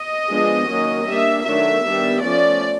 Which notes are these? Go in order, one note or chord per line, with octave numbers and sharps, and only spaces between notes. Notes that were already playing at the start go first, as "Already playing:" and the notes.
Already playing: D#5
F3 G#3 B3 D4
D#3 F#3 A#3 C#4
G3 A#3 D4 E5
D#3 F#3 A3 D4 E5
D#3 G3 B3 D4
F3 A3 C#4 D5